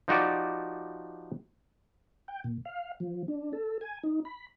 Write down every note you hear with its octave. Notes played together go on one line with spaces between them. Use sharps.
F3 D#4 F#4 G4 D5
G5
A#2
F5
F3
D4
A4
G#5
D#4
B5